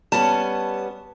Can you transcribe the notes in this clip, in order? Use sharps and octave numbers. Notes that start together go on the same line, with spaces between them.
G3 B3 C#4 A5